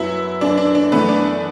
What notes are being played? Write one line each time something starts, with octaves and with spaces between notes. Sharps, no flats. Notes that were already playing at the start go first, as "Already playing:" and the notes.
Already playing: F#2 F#3 B3 E4
F#2 F#3 B3 D4
D4
D4
F#2 E3 A3 B3 E4
D4